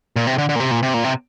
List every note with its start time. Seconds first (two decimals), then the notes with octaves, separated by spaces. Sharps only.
0.16 A#2
0.27 C3
0.38 D3
0.49 D3
0.56 A#2
0.60 C3
0.71 A#2
0.83 C3
0.94 A#2
1.04 C3